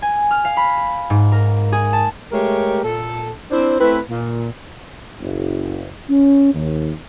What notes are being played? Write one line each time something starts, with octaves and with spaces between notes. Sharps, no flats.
G#5
F6
F5
B5
G#2
A#4
G#4
A5
G#3 A3 G4 A#4 C#5
A#2 A4
C4 D4 E4 C5
A3 C4 E4 B4
A#2
F#1
C#4
D#2